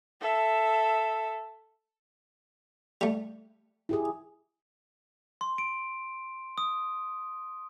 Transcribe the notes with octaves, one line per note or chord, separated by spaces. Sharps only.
A4 E5
G3 A3
E4 G4 G#4
C6
D7
D#6